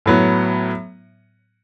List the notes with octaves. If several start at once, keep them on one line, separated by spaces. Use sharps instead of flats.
A2 F#3 B3